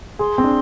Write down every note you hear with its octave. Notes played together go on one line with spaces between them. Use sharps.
G#4 C6
C4
D4